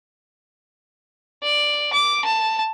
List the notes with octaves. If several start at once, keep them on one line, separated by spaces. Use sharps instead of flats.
D5
D6
A5